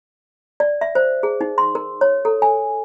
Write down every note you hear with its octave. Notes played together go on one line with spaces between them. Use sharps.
D5
E5
C5
G#4
D#4
C6
A#4
C#5
A4
G#5